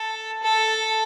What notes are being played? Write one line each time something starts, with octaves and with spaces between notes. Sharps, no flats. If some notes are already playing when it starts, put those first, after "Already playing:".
Already playing: A4
A4